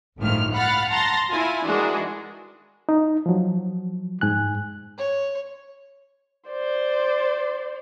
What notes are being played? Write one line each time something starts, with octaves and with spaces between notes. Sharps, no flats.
G1 C#2 A2 D#3 F3 F6
F5 F#5 B5 F6 F#6 A6
A5 A#5 C6 A6 A#6
E4 F4 G#5
D#3 E3 G#3 D4 F#4 G#4
D#4
F3 F#3
G#2 G#5 F#6
C#5
C5 D5